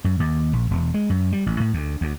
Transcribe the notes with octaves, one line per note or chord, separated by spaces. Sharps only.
F#2
D#2
A#1
E1
G#3
F#2
G3
A1
A2
D2
D2